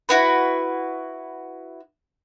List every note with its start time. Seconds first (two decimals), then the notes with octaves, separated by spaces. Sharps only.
0.09 E4 F#4 B4